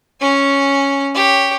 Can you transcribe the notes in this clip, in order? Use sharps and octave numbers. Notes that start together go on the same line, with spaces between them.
C#4 G#5
G4 C#5